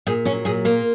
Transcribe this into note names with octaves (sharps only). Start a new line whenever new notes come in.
A#2 G#4
F#3 C#4
A#2 G#4
A#3 F4